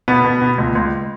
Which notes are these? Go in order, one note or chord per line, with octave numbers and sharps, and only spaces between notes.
B2 B3
B2
B2
C#2
C#2